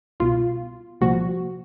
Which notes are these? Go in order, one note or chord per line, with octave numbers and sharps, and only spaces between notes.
C2 B2 F4
C2 A#2 F3 F#4